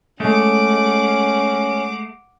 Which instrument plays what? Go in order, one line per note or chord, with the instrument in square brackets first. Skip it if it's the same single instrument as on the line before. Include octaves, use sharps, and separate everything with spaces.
[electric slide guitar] G#3 A3 [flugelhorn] C#4 [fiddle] F#5 D6